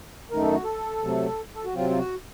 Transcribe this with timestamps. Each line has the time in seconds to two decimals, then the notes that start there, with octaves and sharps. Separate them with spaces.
0.31 F#2 D#3 A3 D#4 A#4
0.42 A4
0.53 F#4
0.64 A4
1.02 C3 F#3 A3
1.55 A4
1.65 F#4
1.74 C3 F#3 C4 F4
1.90 F4
1.98 F#4